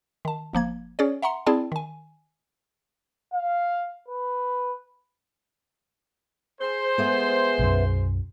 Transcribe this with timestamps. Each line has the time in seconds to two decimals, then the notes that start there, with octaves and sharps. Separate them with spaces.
0.25 D#3 A5
0.53 G1 F3 A#3 G#6
0.99 C#4 G#4 C#5 D5
1.22 E5 F#5 A#5 C6 C#7
1.46 C4 E4 G#4 D5 G5 A5
1.72 D#3 G#5
3.34 F5
4.08 B4
6.61 G#4 C5
6.98 G#3 A3 B3
7.59 B1 F#2